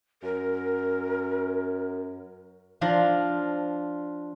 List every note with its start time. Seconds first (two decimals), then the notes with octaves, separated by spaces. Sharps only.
0.23 F#2 A#4
2.81 F3 D4 F4 F5 A#5